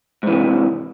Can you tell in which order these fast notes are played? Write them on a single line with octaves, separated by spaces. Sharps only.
G#2 E3 C3